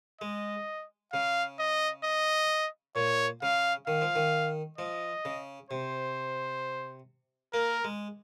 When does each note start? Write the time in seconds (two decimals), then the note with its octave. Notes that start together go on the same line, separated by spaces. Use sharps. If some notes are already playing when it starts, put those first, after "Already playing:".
0.21 G#3 D#5
1.13 C#3 F5
1.59 D#5
2.04 D#5
2.96 A#2 C#5
3.42 C#3 F5
3.87 D#3 F5
4.01 F3
4.15 D#3
4.78 F3 D#5
5.25 C#3
5.71 C3 C5
7.53 A#3 A#4
7.84 G#3